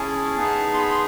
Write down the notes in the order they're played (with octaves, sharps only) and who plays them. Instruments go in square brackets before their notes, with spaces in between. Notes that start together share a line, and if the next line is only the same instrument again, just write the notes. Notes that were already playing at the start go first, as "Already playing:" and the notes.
Already playing: [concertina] C#4 E4 G#4 A5
B3 D#4 G#4
C6
B5
C6